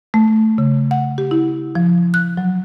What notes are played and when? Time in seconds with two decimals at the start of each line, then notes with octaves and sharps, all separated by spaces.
0.14 A3
0.58 C#3
0.91 F#5
1.18 G4
1.31 E4
1.75 F3
2.14 F#6
2.37 F#3